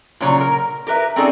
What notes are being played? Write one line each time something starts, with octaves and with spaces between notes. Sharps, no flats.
A#2 C#3 F#3 C#5 A#5
A#4
G4 A#4 B4 E5
C4 C#4 D#4 G#4 A4 D5